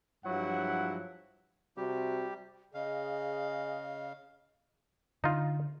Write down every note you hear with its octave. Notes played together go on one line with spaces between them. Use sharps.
G2 F3 F#3 E4 F#5
C3 G3 F#4 G4
C#3 G#4 D#5 F5
D3 D#4 F4